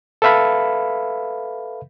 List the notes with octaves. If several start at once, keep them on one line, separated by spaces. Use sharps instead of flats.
A4 B4 E5 F5 B5